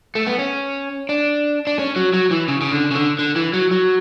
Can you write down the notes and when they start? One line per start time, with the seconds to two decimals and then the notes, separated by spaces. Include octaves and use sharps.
0.15 A3
0.27 B3
0.39 C#4
1.09 D4
1.67 D4
1.79 C#4
1.96 F#3
2.14 F#3
2.31 E3
2.48 C#3
2.61 C#3
2.71 D3
2.91 C#3
2.95 D3
3.19 D3
3.36 E3
3.54 F#3
3.71 F#3